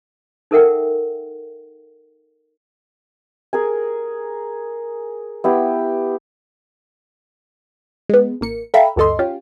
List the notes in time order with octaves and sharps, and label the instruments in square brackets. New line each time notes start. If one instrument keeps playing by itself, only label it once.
[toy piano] D#4 A4 A#4 E5 F#5 G5
[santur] G#4 A#4 G#5
B3 E4 G4
[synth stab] G#3 B3
A1 A#3 C#7
A4 E5 F5 G5 A#5 B5
D2 G2 D3 A4 D#5 C6
C#4 F4 G4